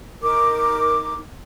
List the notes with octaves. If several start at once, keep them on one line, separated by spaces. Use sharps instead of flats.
D#4 A#4 D6